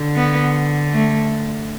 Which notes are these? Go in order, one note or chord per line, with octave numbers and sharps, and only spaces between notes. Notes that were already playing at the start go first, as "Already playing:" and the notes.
Already playing: D3
B3
A3